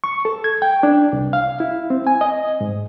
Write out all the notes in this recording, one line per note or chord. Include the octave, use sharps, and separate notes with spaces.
C#6
A4
G#6
G5
D4
C2
F5
E4
C4
G#5
D#5
G#2